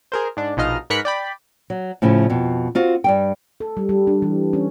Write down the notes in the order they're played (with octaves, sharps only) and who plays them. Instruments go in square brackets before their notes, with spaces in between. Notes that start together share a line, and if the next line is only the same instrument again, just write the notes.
[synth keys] G#4 A#4 C5
G#2 D4
A#1 B2 D#4 F4 D#5 F6
G#2 A#4 B4 F#6 B6 C#7
D5 G5 B5
[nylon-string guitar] F#3
A2 C#3 F3 E4
F2 B2
C4 F4 F#4
G2 G3 G5
[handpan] A4
G3
G3
D4
E3
C#4